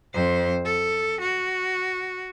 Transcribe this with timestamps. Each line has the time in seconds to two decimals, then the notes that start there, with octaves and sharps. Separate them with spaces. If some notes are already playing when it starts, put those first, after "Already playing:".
0.14 F2 C5
0.65 A4
1.21 F#4